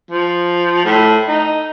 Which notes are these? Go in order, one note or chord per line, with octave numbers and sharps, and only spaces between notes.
F3
A2
D#4